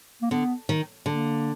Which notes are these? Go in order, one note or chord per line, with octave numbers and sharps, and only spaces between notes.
A#3
D3 B3
D#3
D3 A#3